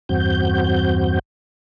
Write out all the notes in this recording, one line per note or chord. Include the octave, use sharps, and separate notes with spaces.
E2 G2 C4 F#4 G6